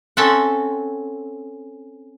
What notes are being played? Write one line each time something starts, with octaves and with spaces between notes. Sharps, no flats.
C4 C#4 A4 E5 F#5